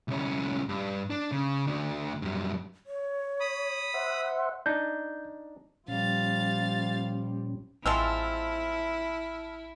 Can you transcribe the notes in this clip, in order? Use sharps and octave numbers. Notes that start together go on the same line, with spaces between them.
C2 C#4
G2
D4
C#3
D2 D3
F#2 G3
C#5
B5 D#6
C5 E5 F#5
D4 D#4 G6
A#2 F3 G3 C#4 F5 A6
A1 F3 G#3 C4 E4 A5 E6 F6